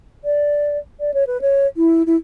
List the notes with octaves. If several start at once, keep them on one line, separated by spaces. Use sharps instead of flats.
D5
D5
C#5
B4
C#5
E4
E4